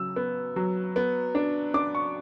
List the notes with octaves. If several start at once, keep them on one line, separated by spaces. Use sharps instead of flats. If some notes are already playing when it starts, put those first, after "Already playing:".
Already playing: C#3 F#3 E6
B3
F#3
B3
D4
D4 D6
C#6